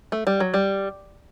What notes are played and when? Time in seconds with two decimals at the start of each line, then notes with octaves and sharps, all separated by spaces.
0.12 A3
0.27 G3
0.40 F#3
0.54 G3